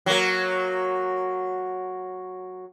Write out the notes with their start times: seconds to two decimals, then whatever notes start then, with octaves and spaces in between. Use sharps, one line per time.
0.06 F#3 A#3